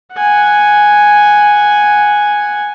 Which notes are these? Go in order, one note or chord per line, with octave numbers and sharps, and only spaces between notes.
F#5 G#5